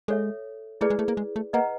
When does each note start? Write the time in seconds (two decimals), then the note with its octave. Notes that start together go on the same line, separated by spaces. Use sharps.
0.08 G#3 A4 C#5 E5
0.81 A3 E4 G#4 B4 D5
0.90 G#3
0.99 A3
1.08 A#3
1.17 G#3
1.36 A3
1.53 A#3 B4 D#5 F#5 A#5